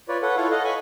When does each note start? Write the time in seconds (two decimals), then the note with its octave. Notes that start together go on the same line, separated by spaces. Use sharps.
0.09 F4 B4 C#5 D5
0.22 A4 B4 C#5 F#5
0.37 E4 F4 A4 C#5 F5
0.51 A4 D#5 F5 F#5
0.64 C#5 G#5 B5 C#6